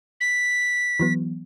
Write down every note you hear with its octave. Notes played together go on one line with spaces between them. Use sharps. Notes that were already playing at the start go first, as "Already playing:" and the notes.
B6
E3 F#3 B3